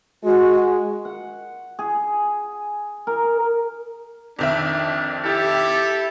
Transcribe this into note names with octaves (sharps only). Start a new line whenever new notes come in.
G#3 F#4
F#5
G#4
A#4
F2 D#3 D4 E5
E4 G4 A4
A4